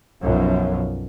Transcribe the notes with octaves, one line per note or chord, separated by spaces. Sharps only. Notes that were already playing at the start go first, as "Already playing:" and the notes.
B1 F#2 F3